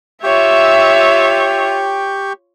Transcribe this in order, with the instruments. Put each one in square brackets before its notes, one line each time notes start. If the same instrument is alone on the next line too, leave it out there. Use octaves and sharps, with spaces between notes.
[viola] F4 C#5 [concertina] G4 G5 C#6 [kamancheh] E5